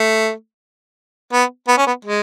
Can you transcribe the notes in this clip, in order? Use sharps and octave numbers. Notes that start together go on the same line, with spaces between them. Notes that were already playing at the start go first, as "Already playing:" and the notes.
Already playing: A3
B3
B3
C#4
B3
G#3